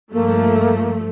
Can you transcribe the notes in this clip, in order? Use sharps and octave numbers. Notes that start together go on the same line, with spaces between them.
G2 F3 A3 A#3